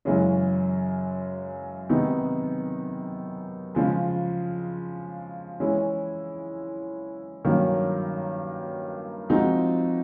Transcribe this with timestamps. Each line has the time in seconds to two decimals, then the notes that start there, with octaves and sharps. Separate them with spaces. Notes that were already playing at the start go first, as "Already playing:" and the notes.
0.05 F#2 C#3 E3 G#3 C#4
1.89 C3 D#3 G#3 B3 D#4
3.75 C#3 F3 G#3
5.60 E3 G#3 C#4 E4
7.45 G2 D#3 F#3 A#3 C#4
9.29 F3 G#3 C4 D#4 F#4